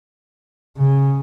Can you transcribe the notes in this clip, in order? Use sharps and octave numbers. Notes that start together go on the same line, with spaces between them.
C#3